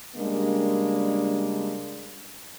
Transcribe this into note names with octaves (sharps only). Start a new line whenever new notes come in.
C#3 G3 G#3 A#3 D4